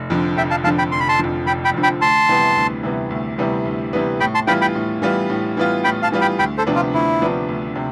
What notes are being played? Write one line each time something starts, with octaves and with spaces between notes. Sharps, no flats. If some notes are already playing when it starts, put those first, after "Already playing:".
Already playing: F1
F2 D3 F3
F1 E5 G5
F5 A5
F2 D3 F3 F5 A5
G5 B5
F1 C6
B5
A5 C6
F2 D3 F3
F1 G5 B5
G5 B5
F2 D3 F3
G5 B5
D2 A5 C6
C3 E3 G3 B3
D2
C3 E3 G3 B3
D2
C3 E3 G3 B3
D2
C3 E3 G3 B3
A2 G5 B5
A5 C6
E3 G3 B3 F4 G5 B5
G5 B5
A2
E3 G3 B3 F4
A2
E3 G3 B3 F4
A2 G5 B5
F5 A5
E3 G3 B3 F4
G5 B5
D2 G5 B5
A4 C5
C3 F3 B3 D4
F4
D2 E4
C3 F3 B3 D4
D2
C3